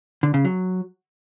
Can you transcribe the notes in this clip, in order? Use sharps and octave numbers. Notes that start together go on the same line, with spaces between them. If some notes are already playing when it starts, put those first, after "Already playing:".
D3
C#3
F#3